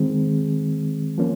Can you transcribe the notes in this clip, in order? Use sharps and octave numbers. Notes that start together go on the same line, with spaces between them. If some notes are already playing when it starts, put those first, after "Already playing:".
Already playing: D#3 G#3 C4
F3 A#3 C#4